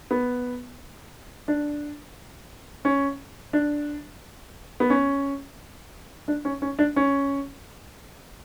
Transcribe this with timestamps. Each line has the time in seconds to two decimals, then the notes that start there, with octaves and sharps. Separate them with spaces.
0.11 B3
1.48 D4
2.85 C#4
3.53 D4
4.80 B3
4.90 C#4
6.28 D4
6.45 C#4
6.62 C#4
6.79 D4
6.96 C#4